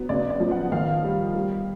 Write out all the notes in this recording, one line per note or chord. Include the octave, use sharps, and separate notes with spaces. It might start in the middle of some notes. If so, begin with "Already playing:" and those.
Already playing: F#3 B3
C#3 D5
D5
F3
F#5
D#3 F5
G3
G3